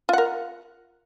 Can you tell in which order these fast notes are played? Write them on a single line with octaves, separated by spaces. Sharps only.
F4 F#5 A#4